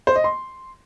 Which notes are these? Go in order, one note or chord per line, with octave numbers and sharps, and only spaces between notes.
C5
D#5
C6